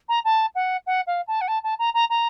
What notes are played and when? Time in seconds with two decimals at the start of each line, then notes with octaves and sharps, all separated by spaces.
0.09 A#5
0.25 A5
0.55 F#5
0.87 F#5
1.07 F5
1.28 A5
1.41 F#5
1.48 A5
1.64 A5
1.79 A#5
1.94 A#5
2.10 A#5